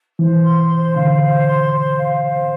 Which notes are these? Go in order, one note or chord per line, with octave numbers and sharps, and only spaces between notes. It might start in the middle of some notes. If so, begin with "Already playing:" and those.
E3 C5
C6
C5
D3 F5
C5
C6
C5
F5
C5